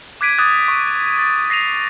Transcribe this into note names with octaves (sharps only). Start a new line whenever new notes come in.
D6 F#6 G#6 B6 D7 D#7
D6 D#6 F#6 A6
C#6
G#6 A6
A#6 C7 D#7 F7